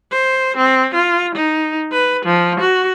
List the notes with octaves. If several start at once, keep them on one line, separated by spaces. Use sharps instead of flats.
C5
C4
F4
D#4
B4
F3
F#4